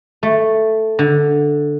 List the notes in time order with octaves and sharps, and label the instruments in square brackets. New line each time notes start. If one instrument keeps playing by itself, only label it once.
[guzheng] A3
D3